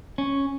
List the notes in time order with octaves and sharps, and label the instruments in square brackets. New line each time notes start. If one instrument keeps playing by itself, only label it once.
[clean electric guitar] C#4